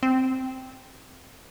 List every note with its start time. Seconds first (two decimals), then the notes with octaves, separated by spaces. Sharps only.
0.03 C4